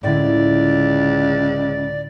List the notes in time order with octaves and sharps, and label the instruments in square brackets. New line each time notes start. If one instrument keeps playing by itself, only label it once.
[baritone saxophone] C#2 [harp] A2 D3 E4 [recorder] D5